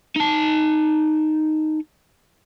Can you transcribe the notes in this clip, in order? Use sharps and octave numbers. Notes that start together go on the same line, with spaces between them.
D#4 A5